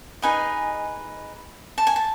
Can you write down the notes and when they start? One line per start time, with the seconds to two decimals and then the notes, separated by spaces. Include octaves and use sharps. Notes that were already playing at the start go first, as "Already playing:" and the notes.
0.22 D#4 G#4 B4 D#5 G#5
1.78 A5
1.87 G#5
1.96 A5